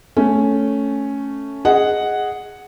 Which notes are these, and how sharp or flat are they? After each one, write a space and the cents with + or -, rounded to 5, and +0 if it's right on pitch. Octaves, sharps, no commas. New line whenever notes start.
A3 +0 C#4 +0
G#4 +0 D#5 +0 F#5 +0